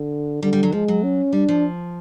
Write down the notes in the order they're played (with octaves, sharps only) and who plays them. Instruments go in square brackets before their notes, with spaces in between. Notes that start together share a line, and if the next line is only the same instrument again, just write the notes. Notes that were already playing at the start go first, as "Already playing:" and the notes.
Already playing: [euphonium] D3
[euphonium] D3 [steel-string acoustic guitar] G3
[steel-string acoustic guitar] G3
F#3
[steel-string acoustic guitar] F3 [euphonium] G#3
[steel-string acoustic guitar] F#3
[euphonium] C#4
[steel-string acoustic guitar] G3 [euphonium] D4
[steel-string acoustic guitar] F3